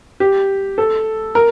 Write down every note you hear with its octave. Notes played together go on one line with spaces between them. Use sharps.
G4
A4
A#4